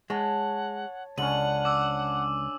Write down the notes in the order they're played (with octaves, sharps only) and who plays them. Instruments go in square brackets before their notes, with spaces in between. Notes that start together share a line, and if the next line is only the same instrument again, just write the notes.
[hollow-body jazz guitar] G#3 [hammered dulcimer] C#5 A5 [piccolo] F#5
[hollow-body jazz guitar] C#2 [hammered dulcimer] D3 C#4 [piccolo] F#5 [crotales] D#7 F#7
[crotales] D6 E6